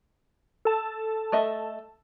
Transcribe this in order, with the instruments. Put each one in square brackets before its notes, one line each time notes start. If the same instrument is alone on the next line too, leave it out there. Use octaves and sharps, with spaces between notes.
[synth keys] A4 A5
[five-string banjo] A3 D#5 E5